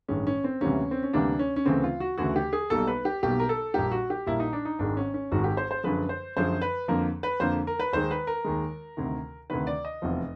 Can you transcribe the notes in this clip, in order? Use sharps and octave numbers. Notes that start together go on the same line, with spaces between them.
A1 G2 D#3 G#3 C#4
C#4
C4
D2 C3 E3 G3 A#3 C#4
C4
C#4
D2 C3 E3 G3 A#3 D4
C#4
C#4
D2 C#3 E3 A3 C4
F4
F#4
D2 C#3 E3 A3 F#4
G4
G#4
B1 B2 G3 A#3 A4
B4
G4
B1 B2 G3 A#3 G4
A#4
A4
A#1 A#2 G3 A#3 G4
F#4
G4
A#1 A#2 G3 A#3 E4
D#4
D4
D#4
G#1 G#2 D#3 G#3 D4
C#4
C#4
G#1 G#2 D#3 G#3 F#4
G4
C5
C5
F#2 D3 F3 G#3 B4
C5
F#2 D3 F3 G#3 C5
B4
F2 D3 F3 A#3 A#4
B4
F2 D3 F3 A#3 C5
A#4
B4
D#2 D#3 G#3 C5
B4
A#4
D#2 D#3 G#3
D2 C3 D#3
D2 C3 D#3 B4
D5
D#5
F1 E2 C3 F3